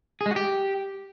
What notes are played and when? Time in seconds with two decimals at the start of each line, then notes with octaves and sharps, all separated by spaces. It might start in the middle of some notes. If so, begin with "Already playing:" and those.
0.21 G#4
0.26 G#3
0.31 F#4
0.36 G4